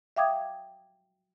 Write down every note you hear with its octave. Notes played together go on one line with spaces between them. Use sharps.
E5 F5 G5 D6 D#6 G#6